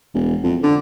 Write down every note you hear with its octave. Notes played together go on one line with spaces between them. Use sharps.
E1
F2
D3